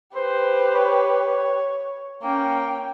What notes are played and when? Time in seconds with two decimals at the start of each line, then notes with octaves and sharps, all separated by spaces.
0.15 G4 B4 C5
0.74 C#5
2.23 A#3 C#4 G5